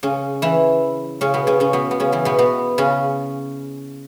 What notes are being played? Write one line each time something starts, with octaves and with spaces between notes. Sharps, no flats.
C#3 C#4
E3 E4
C#3 C#4
B2 B3
C#3 C#4
C#3 C#4
B2 B3
B3
C#3 C#4
E3 E4
B2 B3
B2 B3
C#3 C#4